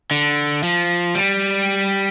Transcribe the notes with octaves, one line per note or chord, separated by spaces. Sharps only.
D3
F3
G3